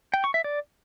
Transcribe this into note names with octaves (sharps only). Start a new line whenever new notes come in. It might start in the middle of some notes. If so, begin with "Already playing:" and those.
G5
C#6
E5
D5